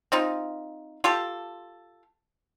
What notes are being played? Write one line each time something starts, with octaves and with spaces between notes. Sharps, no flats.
C4 D#4 F4
F4 G4 A4